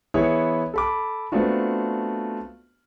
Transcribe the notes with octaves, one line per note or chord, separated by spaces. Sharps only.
E3 B3 E4 G#4 C#5
A4 B5 D6
A3 B3 C4 D4 F4 F#4